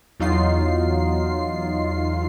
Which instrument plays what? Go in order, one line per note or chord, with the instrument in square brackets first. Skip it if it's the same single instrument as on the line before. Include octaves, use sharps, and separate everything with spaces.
[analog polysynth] E2 F#3 D#4 F4 C7